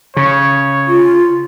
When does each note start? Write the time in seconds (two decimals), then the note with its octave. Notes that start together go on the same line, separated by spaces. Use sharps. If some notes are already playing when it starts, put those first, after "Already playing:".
0.17 C#3 C#5
0.87 F4